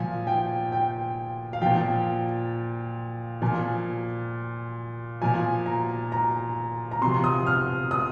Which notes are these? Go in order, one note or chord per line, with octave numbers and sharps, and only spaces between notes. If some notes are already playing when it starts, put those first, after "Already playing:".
Already playing: A#2 F3 G#5
G5
G5
F5
A#2 F3 G5
A#2 F3 G#5
A#2 F3 G#5
A#5
A#5
A#5
C3 F3 C6
D#6
F6
D#6